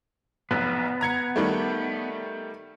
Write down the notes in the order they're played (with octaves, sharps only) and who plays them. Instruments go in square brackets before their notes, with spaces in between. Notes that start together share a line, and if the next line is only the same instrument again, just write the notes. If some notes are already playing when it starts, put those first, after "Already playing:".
[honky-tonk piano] F1 B1 [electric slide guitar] B3
[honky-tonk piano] A#5 G#6 C#7
D#3 G3 A3